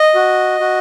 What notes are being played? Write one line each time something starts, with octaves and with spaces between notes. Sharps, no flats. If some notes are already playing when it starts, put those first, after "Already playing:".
Already playing: D#5
F#4
F#4